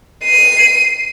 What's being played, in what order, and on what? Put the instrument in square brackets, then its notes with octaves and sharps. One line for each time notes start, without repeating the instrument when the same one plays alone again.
[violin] C7 D#7